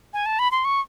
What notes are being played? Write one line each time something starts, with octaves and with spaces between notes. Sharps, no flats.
G#5
A5
B5
C6
C#6